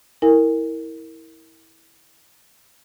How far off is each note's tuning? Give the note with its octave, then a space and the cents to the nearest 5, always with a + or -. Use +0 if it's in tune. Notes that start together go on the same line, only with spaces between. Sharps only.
E4 -20 A#4 -15 G#5 -30